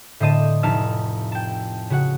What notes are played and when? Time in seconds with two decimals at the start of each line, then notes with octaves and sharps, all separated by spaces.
0.20 A2 D3 C5 D#5 A5 D#7
0.63 F1 D#4 E4 A5 F6
1.32 G5 A5
1.90 C#3 F#4 F#5